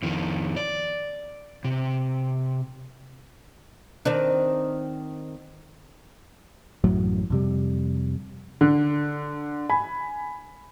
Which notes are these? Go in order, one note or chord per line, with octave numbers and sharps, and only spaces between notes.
F2 D#3
D5
C3
D#3 C4 D4
A1 F#2 A2 F#3
F2 C3 G3
D3
G#5 B5